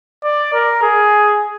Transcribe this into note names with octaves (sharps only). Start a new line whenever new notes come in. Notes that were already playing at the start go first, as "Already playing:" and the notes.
D5
A#4
G#4